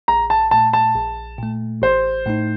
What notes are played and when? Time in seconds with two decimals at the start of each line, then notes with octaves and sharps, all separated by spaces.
0.08 A#1 A#5
0.30 A5
0.51 A#2 A3 A5
0.73 A5
0.96 A#1
1.39 A#2 A3
1.82 A1 C5
2.26 A2 A3 D#4